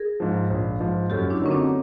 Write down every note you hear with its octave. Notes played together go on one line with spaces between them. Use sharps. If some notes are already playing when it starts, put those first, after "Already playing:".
Already playing: G#4 A#4
G#2 F3
A#1
G#2 F3
F#2 G4 A4
D4 E4
D3 F#3 A#3 C#4 D#4
C4 D4